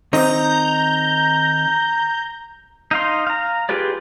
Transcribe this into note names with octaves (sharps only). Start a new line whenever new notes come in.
D#3 C4 D#4 A#5 G6
D#4 F5 C6
F5 A#5
F4 G4 G#4 B4 D5